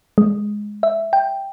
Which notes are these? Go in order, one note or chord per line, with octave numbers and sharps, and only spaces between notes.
G#3
E5
G5